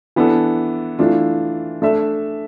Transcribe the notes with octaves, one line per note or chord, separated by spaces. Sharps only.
E3 B3 D4 A4
E3 A3 D4 F4
A3 D4 A4 E5